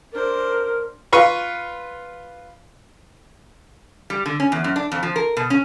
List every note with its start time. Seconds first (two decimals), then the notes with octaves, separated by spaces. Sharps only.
0.13 D4 A#4 C5
1.13 F4 B4 C#6
4.10 G3
4.26 D3
4.40 C#4
4.52 E2
4.64 F#2
4.76 D4
4.92 F2
5.03 F3
5.16 A#4
5.37 B2
5.50 C#4